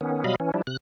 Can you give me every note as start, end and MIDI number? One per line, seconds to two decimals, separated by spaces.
0.01 0.24 51
0.01 0.24 59
0.01 0.24 61
0.24 0.36 47
0.24 0.36 54
0.24 0.36 55
0.24 0.36 75
0.24 0.36 77
0.24 0.36 83
0.40 0.52 52
0.40 0.52 61
0.54 0.62 53
0.54 0.62 55
0.54 0.62 62
0.54 0.62 64
0.67 0.77 48
0.67 0.77 90